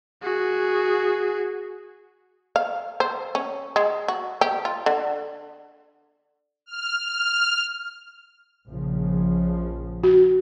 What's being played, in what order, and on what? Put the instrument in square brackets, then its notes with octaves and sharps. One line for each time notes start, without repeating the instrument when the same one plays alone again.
[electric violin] F#4 G#4
[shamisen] F5
C5
C#4
G#3
F#4
G4
F4
D3
[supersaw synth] F6
F6
[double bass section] A#1 C#3 F3
[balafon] F#4